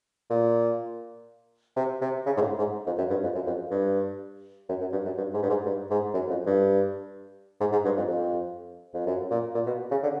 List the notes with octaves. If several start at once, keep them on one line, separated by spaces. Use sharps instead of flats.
A#2
C3
C3
C#3
G#2
A2
G#2
F2
F#2
G2
F2
F#2
F2
G2
F#2
F#2
G2
F#2
G2
G#2
G2
G#2
G2
G#2
F#2
F2
G2
G#2
G#2
G2
F2
F2
F2
F#2
A#2
A#2
B2
C#3
D3